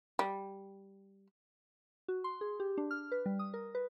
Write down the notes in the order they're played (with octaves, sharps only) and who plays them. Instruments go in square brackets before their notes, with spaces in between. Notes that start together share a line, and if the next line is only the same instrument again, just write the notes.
[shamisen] G3
[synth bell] F#4
C6
G#4
G4
D4
F6
B4
G3
D#6
A#4
B4